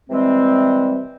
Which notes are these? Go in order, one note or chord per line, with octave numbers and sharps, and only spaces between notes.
C3 E3 G3 G#3 C4